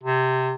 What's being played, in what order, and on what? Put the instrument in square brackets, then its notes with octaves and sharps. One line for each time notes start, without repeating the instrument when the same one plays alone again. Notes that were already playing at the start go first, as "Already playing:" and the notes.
[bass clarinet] C3